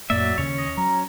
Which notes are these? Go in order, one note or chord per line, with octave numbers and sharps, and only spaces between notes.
F2 A2 F#3 A#3 D5 E5
D#2 C#3 C#4 C#5
D#5
F#3 A#5